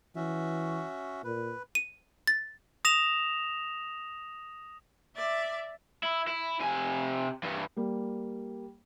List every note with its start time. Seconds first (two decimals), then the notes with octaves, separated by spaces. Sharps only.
0.16 E3 C#4 F#4 E5
1.24 A#2 B4
1.75 D#7
2.27 A6
2.85 D#6 A#6 E7 F7
5.16 D5 E5
6.03 E4
6.27 E4
6.60 C3 G#5
7.43 G2 E3
7.77 G3 A#3